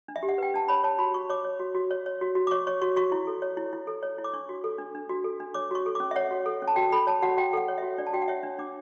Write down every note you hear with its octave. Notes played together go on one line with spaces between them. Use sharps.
D4
E5
G4
F#5
B4 G5
D4 A5
C#5 B5
C#5 A5
F#4 B5
F#4 C#6
C#5 D6
C#5
F#4
F#4
C#5
C#5
F#4
F#4
D6
C#5 C#6
C#5 C#6
F#4 C#6
F#4 C#6
E4
A4
C#5
E4
E4
A4
C#5
E4
D6
D4 C#6
F#4
A4
D4
D4
F#4
A4
D4
C#5 D6
F#4 C#6
A4
D6
C#4
E5
C#5 F#5
F#4
A4
C#4
A5
F#4 G5
A4 B5
C#5 A5
F#4 F#5
F#4 G5
A4 F#5
C#5
E5
F#4
D4 D5
A5
F#4 G5
F#5
C#5 E5
D4
D4 D6